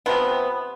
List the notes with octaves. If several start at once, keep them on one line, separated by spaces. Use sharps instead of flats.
C3 F3 B3